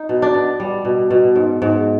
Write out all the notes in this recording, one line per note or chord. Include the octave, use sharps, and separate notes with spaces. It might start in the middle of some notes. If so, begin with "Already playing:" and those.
Already playing: D#4
B2
D4
B3
G3
B2
B2
G#2
G#2